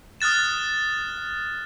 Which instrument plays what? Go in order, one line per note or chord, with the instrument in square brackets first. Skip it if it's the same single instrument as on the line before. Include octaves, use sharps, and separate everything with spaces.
[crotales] D#6 F6 F#6 A6 E7